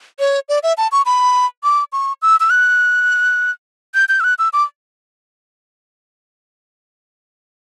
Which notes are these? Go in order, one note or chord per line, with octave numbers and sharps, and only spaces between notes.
C#5
D5
E5
A5
C#6
B5
D6
C#6
E6
E6
F#6
G6
G6
E6
F#6
E6
D6